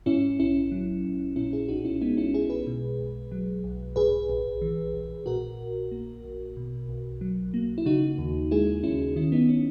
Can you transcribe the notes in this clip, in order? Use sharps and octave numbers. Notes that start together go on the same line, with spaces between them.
G#2 C#4 E4
A#1 C#4 E4
F#3
A#1
A#2 C#4 E4
E4 G#4
B1 D#4 F#4
C#4 E4
G#3 B3 D#4
C#4 E4
B1 E4 G#4
G#4 B4
B2
B1
F#3
B1
G#2 G#4 B4
A#1
E3
A#1
A#2 F#4 A#4
A#1
A#3
A#1
B2
B1
F#3
A#3
E4
C#3 D#4 F#4
D#2
G#3 E4 G#4
D#2 C#4 E4
D#3 C#4 E4
B3 D#4
C#4